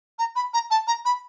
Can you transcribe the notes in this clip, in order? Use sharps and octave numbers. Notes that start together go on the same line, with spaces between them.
A#5
B5
A#5
A5
A#5
B5